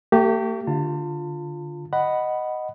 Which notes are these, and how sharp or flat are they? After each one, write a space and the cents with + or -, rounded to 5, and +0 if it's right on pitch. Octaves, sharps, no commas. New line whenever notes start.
A3 +45 G4 -15
D3 +0 F4 +0 A5 +40
D#5 +0 F#5 +5 B5 +0